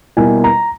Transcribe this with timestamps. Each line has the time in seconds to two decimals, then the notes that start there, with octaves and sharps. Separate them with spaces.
0.17 B2 G3 A#3 E4 G#5
0.44 A#5